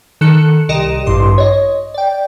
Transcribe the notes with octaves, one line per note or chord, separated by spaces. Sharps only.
D#3 A4 F#6 C#7
C2 G4 D#5 A#5 D#7 E7
A1 G2 C6 D6
C#5 D#5
D5 G5